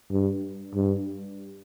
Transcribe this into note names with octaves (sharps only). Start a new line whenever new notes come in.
G2
G2